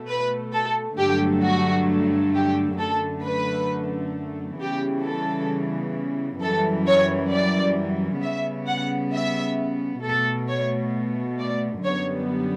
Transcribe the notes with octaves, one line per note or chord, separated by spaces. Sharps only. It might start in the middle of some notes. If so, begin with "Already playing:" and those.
Already playing: B2 A3
B4
A4
G2 D3 F#3 A3 G4
F#4
G4
F#2 D3 A3 A4
B4
C#3 E3 G3 B3 G4
A4
F#2 E3 G3 A4
C#5
D5
C#3 G3 B3 E5
F#5
E5
B2 A3 A4
C#5
D5
F#2 D3 G3 B3 C#5